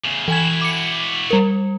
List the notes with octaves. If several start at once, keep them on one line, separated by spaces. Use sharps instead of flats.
E2 C#3
E3 E4 F#4 G#5 G#6
D6 C#7
G3 A#4